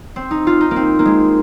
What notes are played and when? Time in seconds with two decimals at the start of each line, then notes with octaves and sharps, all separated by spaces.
0.16 C4
0.31 D#4
0.47 F4
0.61 D#4
0.71 A#3
0.76 C4
0.99 A#3
1.05 G#3